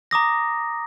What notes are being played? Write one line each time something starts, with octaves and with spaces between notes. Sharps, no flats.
A#5 D6 D#6 A#6